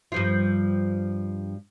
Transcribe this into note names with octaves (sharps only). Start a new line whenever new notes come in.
G2 F3 F4